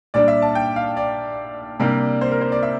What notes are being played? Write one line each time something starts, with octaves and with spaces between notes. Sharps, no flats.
A#2 G3 D4 D5
E5
A5
G5
F5
D5
C3 G3 A#3 D4
C5
A#4
C5
D5
E5